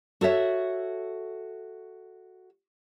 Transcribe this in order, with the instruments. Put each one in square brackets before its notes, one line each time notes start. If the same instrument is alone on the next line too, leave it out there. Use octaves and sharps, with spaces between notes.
[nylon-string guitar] F#4 A4 C#5 E5